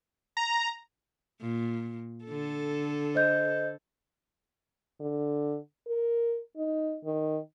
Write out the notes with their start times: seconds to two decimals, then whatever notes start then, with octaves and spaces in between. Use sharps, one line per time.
0.37 A#5
1.41 A#2
2.25 D3 A4
3.15 C5 D#5 G6
5.00 D3
5.87 A#4
6.57 D#4
7.04 D#3